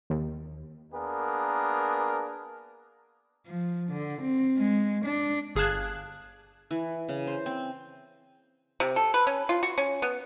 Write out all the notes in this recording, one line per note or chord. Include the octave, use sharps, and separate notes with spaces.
D#2
A#3 B3 D4 G#4 A#4
F3
D3
C4
G#3
D4
G1 G#4 F5 A5 F#6 G#6
E3
C#3
C5
C4
C3
A4
B4
C#4
F4
F#4
C#4
B3